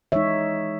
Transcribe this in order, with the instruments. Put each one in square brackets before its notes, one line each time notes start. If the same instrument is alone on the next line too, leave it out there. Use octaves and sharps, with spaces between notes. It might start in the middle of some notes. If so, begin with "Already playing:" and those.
[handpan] E3 G#3 D#4 C#5 E5